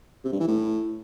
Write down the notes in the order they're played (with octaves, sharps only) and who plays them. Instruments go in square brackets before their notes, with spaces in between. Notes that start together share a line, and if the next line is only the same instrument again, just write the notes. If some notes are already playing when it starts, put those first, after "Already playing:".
[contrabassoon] C3
G2
E3
A2